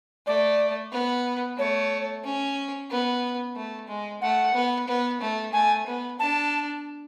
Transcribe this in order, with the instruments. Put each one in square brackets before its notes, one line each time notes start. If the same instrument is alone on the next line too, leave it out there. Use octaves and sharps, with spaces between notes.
[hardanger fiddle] A3 [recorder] D5
[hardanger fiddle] B3
[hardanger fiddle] A3 [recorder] C#5
[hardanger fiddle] C#4
B3
A3
G#3
[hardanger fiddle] A3 [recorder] F#5
[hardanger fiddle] B3
B3
A3
[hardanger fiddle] A3 [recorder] G#5
[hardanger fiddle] B3
[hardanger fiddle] D4 [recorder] A5